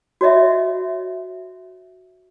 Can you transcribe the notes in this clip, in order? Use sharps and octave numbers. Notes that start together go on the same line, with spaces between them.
F#4 C#5 D#5 E5